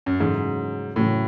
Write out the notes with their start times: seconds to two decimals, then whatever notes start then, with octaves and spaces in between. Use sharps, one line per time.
0.06 F#2
0.20 E2 G#2 C#3 F#3 A3 C#4
0.96 E2 A2 C#3 F#3 A3 C#4